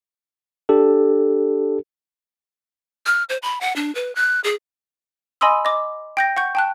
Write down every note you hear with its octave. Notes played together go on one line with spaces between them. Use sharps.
D4 G4 A4
F6
C5
B5
F#5
D4
B4
F#6
G#4
D#5 G#5 B5 C6 D#6 E6
D#5 D6
G5 G6 A#6
F#5 C#6 G6
G5 A5 F#6